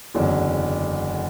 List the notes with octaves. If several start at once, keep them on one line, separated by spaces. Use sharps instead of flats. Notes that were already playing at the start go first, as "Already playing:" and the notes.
F#1 E2 D3 F#3